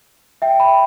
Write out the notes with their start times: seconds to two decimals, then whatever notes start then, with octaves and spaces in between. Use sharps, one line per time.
0.42 E5 G5
0.60 G5 B5